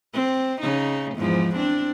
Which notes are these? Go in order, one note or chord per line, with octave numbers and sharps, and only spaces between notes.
C4
C#3 D#4
E2 G#2 F3
C4 D4